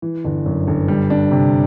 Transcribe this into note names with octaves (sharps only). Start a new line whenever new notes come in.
E3
G1
F#2
G1
G3
D4
C3